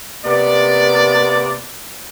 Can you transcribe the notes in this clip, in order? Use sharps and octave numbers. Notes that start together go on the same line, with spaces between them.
C3 A#3 B3 D5